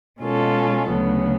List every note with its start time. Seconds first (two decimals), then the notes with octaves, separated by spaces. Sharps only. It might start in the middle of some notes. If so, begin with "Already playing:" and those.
0.21 B2 G#3 C#4 F4 A4
0.89 D2 C#3 F#3 B3